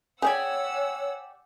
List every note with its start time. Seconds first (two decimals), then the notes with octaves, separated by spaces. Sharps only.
0.22 G4 G#4 C#5 D5 F#5 G#5 E6